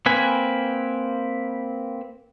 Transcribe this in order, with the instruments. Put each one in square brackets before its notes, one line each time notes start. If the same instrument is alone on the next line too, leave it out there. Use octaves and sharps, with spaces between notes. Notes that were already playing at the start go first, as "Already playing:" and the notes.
[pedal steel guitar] A#3 C4 B4 G#5